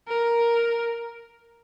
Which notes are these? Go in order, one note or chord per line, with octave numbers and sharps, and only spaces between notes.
A#4